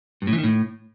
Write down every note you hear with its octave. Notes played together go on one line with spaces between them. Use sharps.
G2
A2
E3
D#3
A2